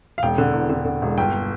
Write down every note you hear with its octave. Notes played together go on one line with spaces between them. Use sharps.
F5
E1 G5
D3
E2
D3
D3
E1
G1 G5